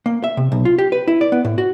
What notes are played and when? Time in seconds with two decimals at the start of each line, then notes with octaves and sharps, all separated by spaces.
0.06 A#3
0.24 E5
0.37 C3
0.52 B1
0.65 F4
0.78 G4
0.92 B4
1.08 E4
1.21 D5
1.32 B3
1.45 A2
1.58 F#4